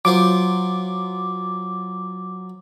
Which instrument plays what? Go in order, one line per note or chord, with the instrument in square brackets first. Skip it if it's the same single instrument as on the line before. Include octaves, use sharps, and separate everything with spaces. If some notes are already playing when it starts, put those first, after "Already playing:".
[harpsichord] F#3 F4 C5 [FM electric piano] D6